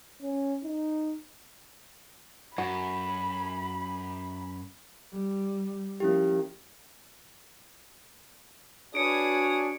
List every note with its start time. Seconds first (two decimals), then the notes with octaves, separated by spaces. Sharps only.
0.22 C#4
0.63 D#4
2.58 F#2 F#4 B5
5.13 G3
6.00 F3 A#3 C#4 E4 G4
8.95 D4 F#4 G#4 B4 C#5 D#6 C#7 D7